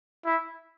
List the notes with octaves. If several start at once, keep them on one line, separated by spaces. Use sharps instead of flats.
E4